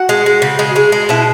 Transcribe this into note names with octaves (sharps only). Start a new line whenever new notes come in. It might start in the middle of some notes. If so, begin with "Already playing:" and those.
Already playing: F#4 F#5
G#3
G#3
C#3
G#3
G#3
G#3
B2 E4 E5